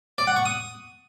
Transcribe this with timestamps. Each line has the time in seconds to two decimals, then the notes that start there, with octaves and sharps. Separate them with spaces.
0.18 D5
0.27 F#5
0.36 C#6
0.46 D#6